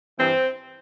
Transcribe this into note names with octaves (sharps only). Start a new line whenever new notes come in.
G2 E3 C4